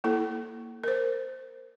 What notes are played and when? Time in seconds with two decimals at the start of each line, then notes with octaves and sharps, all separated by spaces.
0.04 A#3 E4 A4
0.84 A#4 C5